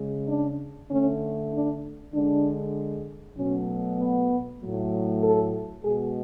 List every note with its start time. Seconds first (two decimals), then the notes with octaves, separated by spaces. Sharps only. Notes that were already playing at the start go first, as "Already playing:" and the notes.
Already playing: C#3 G#3
0.27 D4
0.89 D3 A3 C#4
1.51 D4
2.13 D3 G#3 D4
3.36 B2 F#3 A3 C#4
3.98 B3
4.60 A2 F#3 A3
5.22 A4
5.83 B2 G#3 G#4